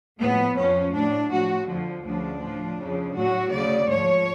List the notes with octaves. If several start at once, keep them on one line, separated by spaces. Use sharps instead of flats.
A2 F3 B3
F2 F3 C#4
A2 F#3 D4
A2 F3 F#4
F2 D3 F3
D2 C#3 F3 D4
A2 F3
F2 C#3 F3
A2 F#3 F#4
D2 C#3 F#3 D5
G#2 F3 C#5